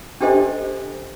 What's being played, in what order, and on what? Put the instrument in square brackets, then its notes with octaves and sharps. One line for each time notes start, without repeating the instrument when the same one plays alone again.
[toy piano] C#4 D4 G4 A4 C5 D#5